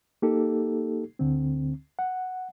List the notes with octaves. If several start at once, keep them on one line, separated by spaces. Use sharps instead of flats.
A#3 D#4 G4 A4
D2 D3 C4
F#5